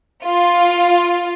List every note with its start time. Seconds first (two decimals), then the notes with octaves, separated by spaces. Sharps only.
0.23 F4